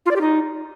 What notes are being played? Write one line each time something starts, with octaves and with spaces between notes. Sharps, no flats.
F4
D5
G4
D#4